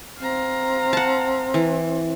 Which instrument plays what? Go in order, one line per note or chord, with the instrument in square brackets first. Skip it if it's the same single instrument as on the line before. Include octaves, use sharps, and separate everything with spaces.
[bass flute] C4 [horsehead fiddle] F5 A#5
[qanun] F#5 A5
E3